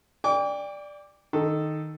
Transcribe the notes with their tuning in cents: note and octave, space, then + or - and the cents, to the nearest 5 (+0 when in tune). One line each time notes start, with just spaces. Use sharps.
D5 +0 G5 +30 D6 -35
D#3 -5 A4 +0